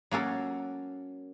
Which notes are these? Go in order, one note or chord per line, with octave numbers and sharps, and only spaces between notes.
F#3 A#3 C#4 A4